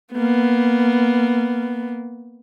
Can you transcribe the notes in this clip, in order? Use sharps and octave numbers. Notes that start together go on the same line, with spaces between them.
A#3 B3